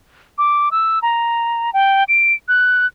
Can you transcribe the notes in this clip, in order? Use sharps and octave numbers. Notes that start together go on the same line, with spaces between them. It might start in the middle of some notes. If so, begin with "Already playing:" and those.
D6
E6
A#5
G5
D7
F#6